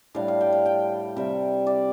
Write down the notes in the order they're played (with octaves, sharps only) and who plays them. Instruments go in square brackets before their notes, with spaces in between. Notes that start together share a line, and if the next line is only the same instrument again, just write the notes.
[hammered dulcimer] A2 G3 D4 F5
F5
G5
F5
G5
C3 G3 C4 E5
D5